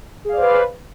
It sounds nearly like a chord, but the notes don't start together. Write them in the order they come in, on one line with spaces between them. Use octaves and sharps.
G#4 F5 D5 C5 B4